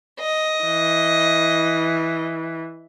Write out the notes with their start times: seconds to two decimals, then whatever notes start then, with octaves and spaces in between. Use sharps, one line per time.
0.20 D#5
0.64 E3